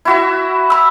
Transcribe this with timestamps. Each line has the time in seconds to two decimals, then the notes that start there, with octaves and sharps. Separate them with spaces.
0.05 E4 F#4 E5
0.70 B5 E6